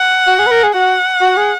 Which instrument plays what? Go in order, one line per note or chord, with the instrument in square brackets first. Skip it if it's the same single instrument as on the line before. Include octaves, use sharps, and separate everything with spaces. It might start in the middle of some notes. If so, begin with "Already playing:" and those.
Already playing: [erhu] F#5
[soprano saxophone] F#4
G#4
B4
A#4
G#4
[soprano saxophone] F#4 [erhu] F#5
[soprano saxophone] F#4
G#4